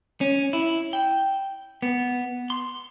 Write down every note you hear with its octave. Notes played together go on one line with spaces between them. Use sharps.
C#4
E4
G5
B3
C6